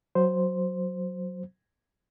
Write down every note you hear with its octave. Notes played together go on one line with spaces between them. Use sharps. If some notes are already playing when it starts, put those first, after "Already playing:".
F#3 C5